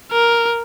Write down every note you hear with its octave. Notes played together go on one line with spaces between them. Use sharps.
A#4